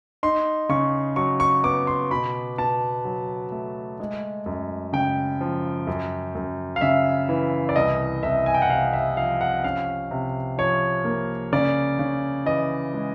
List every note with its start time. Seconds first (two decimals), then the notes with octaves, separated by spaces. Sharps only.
0.23 D#4 C6
0.69 C#3 C#6
1.16 F#3 C#6
1.40 C#6
1.64 B3 D6
1.87 C6
2.11 B2 B5
2.58 B2 A5
3.05 F#3
3.52 A3
4.00 G#3
4.46 F#2
4.93 C#3 G5
5.41 F3
5.87 F#2
6.35 F#2
6.76 F5
6.81 C#3 E5
7.29 E3
7.69 D5
7.76 C2 D#5
8.23 C2 E5
8.46 G#5
8.54 G5
8.62 F#5
8.69 C3 F5
8.93 E5
9.17 F3 F5
9.41 F#5
9.64 C#4 F5
10.11 C3
10.58 F3 C#5
11.05 A#3
11.52 C#3 D5
11.99 C#3
12.46 E3 D#5
12.94 G#3